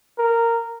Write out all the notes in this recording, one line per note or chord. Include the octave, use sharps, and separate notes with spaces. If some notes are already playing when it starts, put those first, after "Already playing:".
A#4